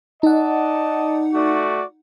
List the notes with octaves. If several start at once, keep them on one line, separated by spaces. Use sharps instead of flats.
D#4 D5 D#5 F#5 A5
A3 F#4 D5